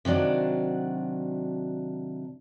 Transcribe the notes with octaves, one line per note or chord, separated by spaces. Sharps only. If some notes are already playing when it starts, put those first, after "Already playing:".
C3 D#3 F#3 D4 F#4